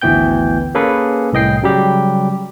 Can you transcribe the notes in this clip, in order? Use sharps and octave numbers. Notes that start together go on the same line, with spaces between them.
G#1 D2 E3 B3 G5 G6
A#3 C#4 G#4 A4 B4
C2 A2 D#5 G5 C7
C#3 F#3 G3 G4